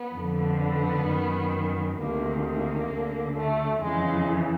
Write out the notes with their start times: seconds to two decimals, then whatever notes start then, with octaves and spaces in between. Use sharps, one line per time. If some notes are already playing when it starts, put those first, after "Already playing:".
Already playing: B3
0.14 F2 D3
0.59 B3
1.05 F#2 D#3
1.97 D2 C3 D#3 A#3
2.45 A#3
2.90 D2 D3
3.36 A3
3.82 F2 C#3 E3 G#3